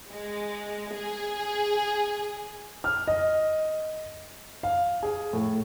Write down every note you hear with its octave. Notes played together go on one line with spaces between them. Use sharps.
G#3
G#4
F6
D#5
F5
G#4
A2